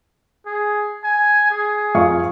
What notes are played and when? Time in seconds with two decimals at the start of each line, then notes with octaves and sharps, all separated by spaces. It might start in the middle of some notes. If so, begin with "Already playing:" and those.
0.46 G#4
1.04 G#5
1.51 G#4
1.95 F2 F5 C#6